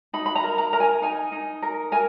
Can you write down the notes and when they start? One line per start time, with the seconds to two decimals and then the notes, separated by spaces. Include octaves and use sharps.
0.13 D#4 B5
0.26 B5
0.35 A#5
0.43 A#4
0.58 A#5
0.73 A#4 A#5
0.80 G#5
1.02 D#4 G#5
1.32 D#4
1.62 A#4
1.92 A#4 G#5